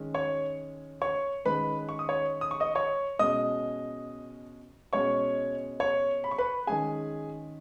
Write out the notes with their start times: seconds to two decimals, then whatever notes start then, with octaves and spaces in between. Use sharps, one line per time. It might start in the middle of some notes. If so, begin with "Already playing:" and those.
Already playing: D#3 G#3 C#4
0.15 C#5 C#6
1.02 C#5 C#6
1.45 D#3 G#3 C#4 B4 B5
1.89 C#6
1.99 D#6
2.09 C#5 C#6
2.41 D#6
2.51 C#6
2.60 D#5 D#6
2.75 C#5 C#6
3.19 B2 G#3 C#4 D#5 D#6
4.93 B2 G#3 C#4 C#5 C#6
5.80 C#5 C#6
6.24 B5
6.31 C#6
6.38 B4 B5
6.67 D#3 G#3 C#4 G#4 G#5